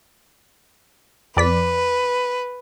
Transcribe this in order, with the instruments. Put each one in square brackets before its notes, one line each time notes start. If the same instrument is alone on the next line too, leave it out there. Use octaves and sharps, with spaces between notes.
[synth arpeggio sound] F2 D5 B6 [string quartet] B4